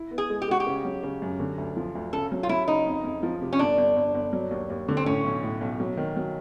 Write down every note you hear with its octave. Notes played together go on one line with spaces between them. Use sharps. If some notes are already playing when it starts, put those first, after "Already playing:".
Already playing: E4
B3
G#4
G#3
G4
G#3 F#4
G4
C#3
F#3
C#3
F#2
D3
D2
F3
D2
C#3 A4
F#3
F4
F#3 E4
C#3 D#4
F2
F2
F3
C3
C#4
G1 D4
G1
G1
G1
F#3
D#2
D#2
D3
C4
A2 C#4
B1
A2
B1
F#3
D#3
F#3